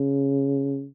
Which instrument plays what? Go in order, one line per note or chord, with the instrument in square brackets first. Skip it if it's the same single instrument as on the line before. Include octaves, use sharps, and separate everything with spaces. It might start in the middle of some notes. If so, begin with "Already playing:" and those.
Already playing: [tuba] C#3